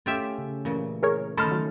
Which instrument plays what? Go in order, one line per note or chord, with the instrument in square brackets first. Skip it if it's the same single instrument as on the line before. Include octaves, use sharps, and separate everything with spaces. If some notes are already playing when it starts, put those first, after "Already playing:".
[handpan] A3 C#4 A4 [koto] F4 G4 E5
[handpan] C#3
[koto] A#2 C#3 [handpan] E3 A3
[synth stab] G#4 A#4 C#5
[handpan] D#3 A3 C#4 [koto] D#4 A4 [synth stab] B5 C6 F6
[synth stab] F#3